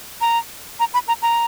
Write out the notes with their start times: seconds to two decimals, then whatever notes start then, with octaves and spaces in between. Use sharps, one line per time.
0.21 A#5
0.80 A#5
0.94 B5
1.08 A#5
1.22 A#5